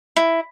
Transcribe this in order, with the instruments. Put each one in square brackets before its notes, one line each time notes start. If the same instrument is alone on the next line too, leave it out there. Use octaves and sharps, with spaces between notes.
[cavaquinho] E4